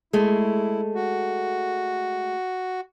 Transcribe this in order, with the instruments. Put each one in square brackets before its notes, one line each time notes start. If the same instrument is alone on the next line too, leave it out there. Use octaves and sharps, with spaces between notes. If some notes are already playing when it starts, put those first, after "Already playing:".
[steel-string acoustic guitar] G#3 A3 [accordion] E4
[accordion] F#4